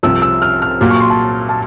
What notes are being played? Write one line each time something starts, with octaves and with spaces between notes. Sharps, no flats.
C2 C3 F3 E6
E6
F6
F6
A#2 F#3 A#3 F6
C#6
C6
A5
A5